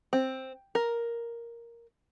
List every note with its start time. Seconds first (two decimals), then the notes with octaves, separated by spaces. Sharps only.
0.13 C4
0.75 A#4